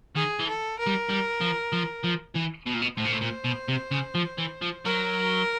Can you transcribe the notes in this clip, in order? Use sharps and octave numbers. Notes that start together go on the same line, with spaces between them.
D#3 G#4
E3
A4
A#4
G3
G3
F3
F3
F3
E3
B2
A#2
B2
A2 C5
A#2
A2
A#2
B2
C3
C#3
F3
E3
F3
F#3 A#4